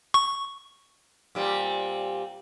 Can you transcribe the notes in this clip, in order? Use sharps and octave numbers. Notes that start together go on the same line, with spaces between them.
C#6
A#2 G3 C4